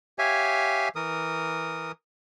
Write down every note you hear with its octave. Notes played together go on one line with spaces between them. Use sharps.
G4 C#5 E5 F5 G#5
E3 A#4 D#6